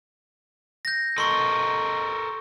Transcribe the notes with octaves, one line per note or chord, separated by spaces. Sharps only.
G6 A#6
A4 A#4 D#5 C6 C#6